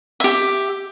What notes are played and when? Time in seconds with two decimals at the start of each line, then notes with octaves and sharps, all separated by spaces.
0.20 G4 E5